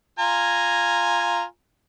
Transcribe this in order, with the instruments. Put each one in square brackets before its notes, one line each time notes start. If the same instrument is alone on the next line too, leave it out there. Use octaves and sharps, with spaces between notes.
[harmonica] F4 G#5 A#5